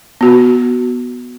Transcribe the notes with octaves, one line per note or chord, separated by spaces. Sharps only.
B3 F#4